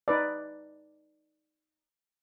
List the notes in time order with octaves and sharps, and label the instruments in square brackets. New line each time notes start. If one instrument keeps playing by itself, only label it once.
[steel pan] D#4 B4 D5